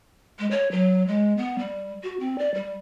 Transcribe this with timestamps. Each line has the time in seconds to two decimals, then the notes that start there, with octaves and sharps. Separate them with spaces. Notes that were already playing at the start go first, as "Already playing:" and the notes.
0.39 G#3
0.51 C#5
0.72 F#3
1.07 G#3
1.37 B3
1.59 G3
2.03 F#4
2.20 C4
2.39 D5
2.54 G3